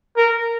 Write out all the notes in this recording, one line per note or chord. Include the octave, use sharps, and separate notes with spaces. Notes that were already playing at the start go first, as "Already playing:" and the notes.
A#4